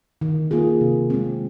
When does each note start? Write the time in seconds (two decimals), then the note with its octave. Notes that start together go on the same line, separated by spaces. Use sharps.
0.21 D#3
0.51 A#3 F4 G#4
0.81 C3
1.10 G#3 C4